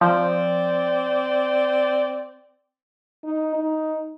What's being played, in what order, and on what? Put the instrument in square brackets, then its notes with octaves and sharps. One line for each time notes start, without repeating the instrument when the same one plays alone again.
[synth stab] F3 [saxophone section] C4 D5
[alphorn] D#4
D#4